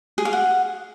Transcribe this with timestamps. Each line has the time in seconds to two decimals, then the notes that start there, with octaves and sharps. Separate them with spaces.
0.18 G#4
0.25 F5
0.33 F#5